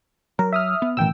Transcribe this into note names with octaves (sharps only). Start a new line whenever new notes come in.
F#3 A#4
E5 D#6 F6
B3
A1 B2 D#3 G5 E6